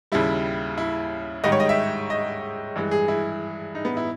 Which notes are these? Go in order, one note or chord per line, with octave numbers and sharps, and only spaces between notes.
D#2 C#3 G3 E4
E4
G#2 D#3 G3 D#5
C#5
D#5
E5
D#5
G2 E3 G#3
G#4
E4
D#4
B3
E4